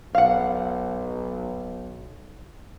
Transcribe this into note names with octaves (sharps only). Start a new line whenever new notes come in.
B1 F5 F#5